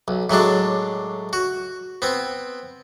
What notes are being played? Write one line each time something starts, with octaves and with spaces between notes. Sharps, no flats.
B1
A2 F#3 G#3 D4
F#4
B3 C4